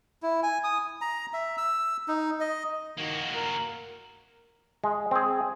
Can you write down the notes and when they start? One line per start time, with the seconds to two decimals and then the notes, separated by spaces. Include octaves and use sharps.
0.23 E4
0.43 G#5
0.64 D#6
1.01 A#5
1.33 E5
1.58 E6
2.08 D#4
2.40 D#5
2.97 D#3 A#3 F#4
3.35 A#4
4.84 G#3
5.11 C4 G#4